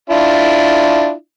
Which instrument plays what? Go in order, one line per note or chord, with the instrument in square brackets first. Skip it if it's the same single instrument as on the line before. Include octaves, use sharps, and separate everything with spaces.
[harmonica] D4 E4 F4